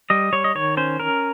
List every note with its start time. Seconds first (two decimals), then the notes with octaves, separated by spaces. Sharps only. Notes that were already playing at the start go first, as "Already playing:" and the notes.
0.10 G3 D#5
0.33 G3 C#5
0.44 D#5
0.55 D#3 C#5
0.77 C#4 C5
1.00 C#4 A#4